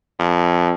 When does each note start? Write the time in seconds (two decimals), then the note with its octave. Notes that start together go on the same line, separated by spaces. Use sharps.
0.19 F2